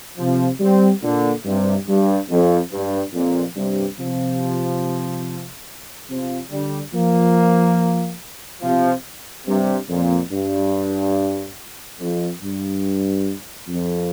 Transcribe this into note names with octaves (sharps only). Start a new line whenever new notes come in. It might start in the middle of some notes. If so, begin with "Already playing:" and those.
C3 F3
G3 C4
A#2 D3
G2 C3
G2
F2
G2
F2 A#2
G2 C3
C3 F3
C3 F3
D3 G3
F3 A#3
C3 F3
G2 C3
F2 A#2
G2
F2
G2
F2